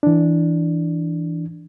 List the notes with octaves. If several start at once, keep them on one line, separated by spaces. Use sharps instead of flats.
E3 D4